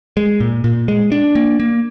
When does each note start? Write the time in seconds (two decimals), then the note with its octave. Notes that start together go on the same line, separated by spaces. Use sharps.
0.17 G#3
0.40 A#2
0.64 A#2
0.88 G#3
1.12 D4
1.35 A#3
1.60 A#3